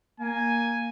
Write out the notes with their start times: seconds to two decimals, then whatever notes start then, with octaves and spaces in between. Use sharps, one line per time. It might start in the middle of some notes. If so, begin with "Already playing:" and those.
0.20 A#3 G#5